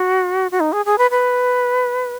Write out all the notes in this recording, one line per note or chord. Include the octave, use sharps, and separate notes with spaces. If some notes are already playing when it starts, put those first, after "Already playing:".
Already playing: F#4
F#4
D#4
G#4
G#4
B4
B4